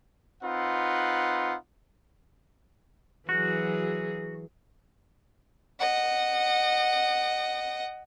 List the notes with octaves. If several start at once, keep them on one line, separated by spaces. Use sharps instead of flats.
C4 D#4 F4 B4 F#5
E3 F#3 F#4 G#4
D#5 F#5